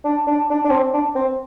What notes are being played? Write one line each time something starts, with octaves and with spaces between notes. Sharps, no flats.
D4
D4
D4
D4
C4
D4
C4